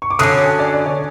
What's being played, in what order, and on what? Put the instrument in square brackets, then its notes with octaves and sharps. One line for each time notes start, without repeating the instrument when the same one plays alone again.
[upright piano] C#6
D6
[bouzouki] D3 F#3 A3 C#4 [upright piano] D#6
[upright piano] G#5
D5
D5
C#5